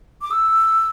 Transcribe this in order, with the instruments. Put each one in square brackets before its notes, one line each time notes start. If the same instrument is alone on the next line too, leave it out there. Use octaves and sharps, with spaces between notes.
[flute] D6
E6